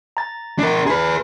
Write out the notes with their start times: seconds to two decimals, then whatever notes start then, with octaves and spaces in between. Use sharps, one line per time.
0.17 A#5 A6
0.59 D4 A#4
0.86 G#4 B4 A#5